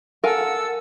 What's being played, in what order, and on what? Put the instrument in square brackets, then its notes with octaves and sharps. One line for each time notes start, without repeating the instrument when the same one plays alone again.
[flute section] A4 F#5 E6 [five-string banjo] A#4 F5 G#5